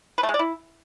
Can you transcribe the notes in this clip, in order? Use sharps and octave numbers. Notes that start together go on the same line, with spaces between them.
B4
A3
G#3
D5
E4